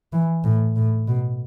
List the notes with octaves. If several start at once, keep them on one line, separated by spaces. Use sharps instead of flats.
E3
A2
A2
B2